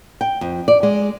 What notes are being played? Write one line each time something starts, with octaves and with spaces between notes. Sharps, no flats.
G5
F2
D5
G#3